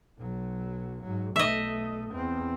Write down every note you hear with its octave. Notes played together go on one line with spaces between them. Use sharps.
B1 F#3
G#2 F#3
B1 A3 D#5 E5
E2 C4